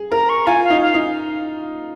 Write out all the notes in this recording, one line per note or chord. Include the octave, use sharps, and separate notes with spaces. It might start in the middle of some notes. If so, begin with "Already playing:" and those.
Already playing: G#4
A#4 A#5
C#6
F4 G#5
F5
D#4
F5
D#4